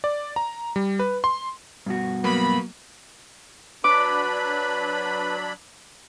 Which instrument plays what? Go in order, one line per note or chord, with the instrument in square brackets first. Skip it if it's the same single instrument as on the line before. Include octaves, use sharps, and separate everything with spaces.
[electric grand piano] D5
A#5
G3
B4
C6
[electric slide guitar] G2 B2 F#4
[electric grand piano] F#3 A#3 B3 [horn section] B5
[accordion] F#3 D4 B5 [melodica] B4 [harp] D6